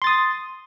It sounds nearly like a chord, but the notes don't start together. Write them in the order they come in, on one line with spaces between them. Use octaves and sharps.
C6 A6 D#6